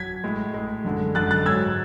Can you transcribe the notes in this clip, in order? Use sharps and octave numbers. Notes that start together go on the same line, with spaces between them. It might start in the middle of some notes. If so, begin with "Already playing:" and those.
Already playing: F#3 G#6 B6
A2 G#3
A2 G#3
F#2 D3 G#3
F#2 D3 G#3 F#6 A6
F#6 A6
G#2 F#3 E6 G#6